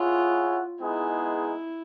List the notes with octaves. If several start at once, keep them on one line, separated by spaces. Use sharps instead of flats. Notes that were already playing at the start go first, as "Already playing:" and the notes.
Already playing: E4 F4 G#4 C#5 F#5
G#3 B3 D#4 E4 G#4